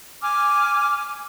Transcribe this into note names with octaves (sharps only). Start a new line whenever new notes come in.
G#5 D6 F6